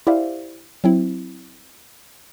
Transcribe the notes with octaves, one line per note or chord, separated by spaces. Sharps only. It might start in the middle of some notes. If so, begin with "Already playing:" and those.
E4 G4 C5 D5 E5 F5
F#3 C4 E4